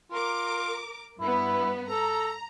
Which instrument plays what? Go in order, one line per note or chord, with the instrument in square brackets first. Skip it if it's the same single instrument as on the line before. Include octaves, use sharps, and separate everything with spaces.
[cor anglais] F4 [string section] A#4 D6
[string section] G2 B3 [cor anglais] E4
[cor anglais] A4 [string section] A#5